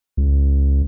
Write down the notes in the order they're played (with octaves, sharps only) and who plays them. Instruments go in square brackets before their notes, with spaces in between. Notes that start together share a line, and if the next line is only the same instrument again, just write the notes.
[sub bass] C#2